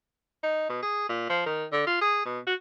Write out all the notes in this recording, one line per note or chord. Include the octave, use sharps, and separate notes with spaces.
D#4
B2
G#4
A#2
F3
D#3
D3
F4
G#4
B2
F#4